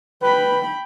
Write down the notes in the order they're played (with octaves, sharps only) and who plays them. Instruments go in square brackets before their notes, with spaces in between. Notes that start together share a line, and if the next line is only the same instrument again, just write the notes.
[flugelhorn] B4 [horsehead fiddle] G5 B5